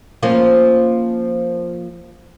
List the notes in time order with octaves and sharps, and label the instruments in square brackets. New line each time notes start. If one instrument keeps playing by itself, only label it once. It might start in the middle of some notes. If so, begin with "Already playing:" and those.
[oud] F3 A#3 C#4